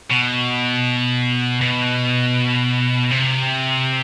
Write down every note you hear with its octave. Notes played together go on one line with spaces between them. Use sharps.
B2
B2
C3